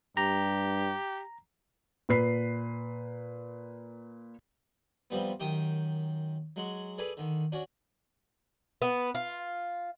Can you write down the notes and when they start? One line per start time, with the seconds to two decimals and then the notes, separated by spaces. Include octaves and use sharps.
0.17 G2 G4 A#5
2.09 A#2 B4 C7
5.10 C3 F3 G3 B3
5.40 F#2 D#3 G4 G5 D#6
6.56 F#3 G#3 F#5
6.98 G#4 A4 B4 D5 G#5
7.17 D3 D#3
7.52 C#4 D4 F#4
8.82 B3
9.15 F4